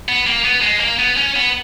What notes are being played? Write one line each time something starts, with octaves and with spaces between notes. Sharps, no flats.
B3
A#3
B3
G#3
A#3
B3
C#4
B3